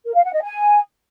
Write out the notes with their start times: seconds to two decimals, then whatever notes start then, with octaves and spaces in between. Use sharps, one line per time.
0.05 A#4
0.15 F5
0.24 F#5
0.33 D#5
0.42 G#5